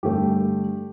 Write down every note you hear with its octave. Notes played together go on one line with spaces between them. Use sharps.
G2 D3 A3 G4